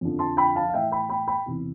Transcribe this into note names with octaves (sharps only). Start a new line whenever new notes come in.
F2 D3 F3
A5 C6
G5 B5
F5 A5
F5
A2 E3 E5 G5
G5 B5
G5 B5
G5 B5
E2 C3 E3